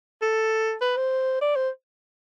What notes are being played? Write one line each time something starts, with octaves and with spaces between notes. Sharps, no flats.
A4
B4
C5
D5
C5